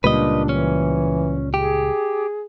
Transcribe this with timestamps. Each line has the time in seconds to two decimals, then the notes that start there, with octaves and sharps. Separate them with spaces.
0.04 C#2 A#2 G3 D4 B4 D#5
0.49 E3 C#4
1.54 G4 G#4